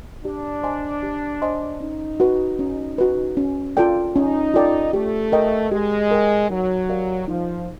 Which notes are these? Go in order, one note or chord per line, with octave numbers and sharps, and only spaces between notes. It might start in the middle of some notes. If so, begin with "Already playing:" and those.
D4 G4
C5 D#5 G#5 C6
G4
C5 D#5 G#5 C6
C#4 D#4
F#4 B4
C#4
F#4 B4
C#4
F4 A4 D5 G5
C#4 D#4
F4 A4 D5 G5
A3 G4
A#4 D#5 G5
G#3 G4
A#4 D#5 G5
F#3 D#4
G4 A#4 D5 F5
F3 D#4